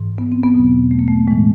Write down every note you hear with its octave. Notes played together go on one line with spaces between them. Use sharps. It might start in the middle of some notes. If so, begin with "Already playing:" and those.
Already playing: G#2 E3
B3
C4
B3
E2 B2 F#3
A3
A#3
A3
A2 E3 G#3